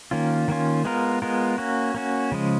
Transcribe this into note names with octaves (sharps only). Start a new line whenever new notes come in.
D#3 A#3 C#4 F4
D#3 A#3 C#4 F4
G#3 B3 F4 A#4
G#3 B3 F4 A#4
A#3 C#4 F#4
A#3 C#4 F#4
C#3 F3 G#3